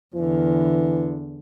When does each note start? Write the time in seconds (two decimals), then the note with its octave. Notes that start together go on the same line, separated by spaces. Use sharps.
0.16 E2 D3 E3